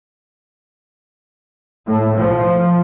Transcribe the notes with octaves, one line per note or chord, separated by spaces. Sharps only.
A2
F3